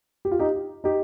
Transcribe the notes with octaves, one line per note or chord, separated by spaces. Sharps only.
G4
F4
D#4 G4
D#4 G4